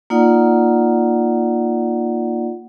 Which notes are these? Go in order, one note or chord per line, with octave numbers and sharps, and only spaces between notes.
A#3 D#4 F4 D5 F#5